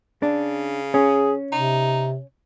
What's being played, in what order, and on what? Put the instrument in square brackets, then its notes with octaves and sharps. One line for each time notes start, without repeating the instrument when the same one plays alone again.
[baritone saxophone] C#3 [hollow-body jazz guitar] D4
[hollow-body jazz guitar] C#4 [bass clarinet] G#4
[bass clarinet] C3 [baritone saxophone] D#4